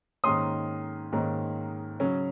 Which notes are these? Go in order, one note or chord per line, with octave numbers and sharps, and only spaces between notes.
G#2 D#3 A#3 C#4 C6 D#6
G#2 D#3 A#3 C#4
C#3 F#3 C#4